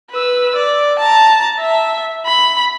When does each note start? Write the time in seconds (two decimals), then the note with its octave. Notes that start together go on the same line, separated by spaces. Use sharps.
0.11 B4 E6
0.56 D5
0.99 A5 A#5
1.60 E5
2.26 B5